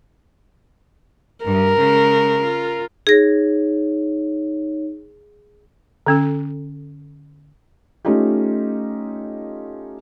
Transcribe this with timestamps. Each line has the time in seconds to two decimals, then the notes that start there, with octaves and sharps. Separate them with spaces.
1.45 G2 A#4
1.79 C#3 G#3
2.42 F4
3.07 D#4 G#4 C#5 A#6
6.06 D3 C#4 A4
8.05 A3 C#4 D#4 F4 G4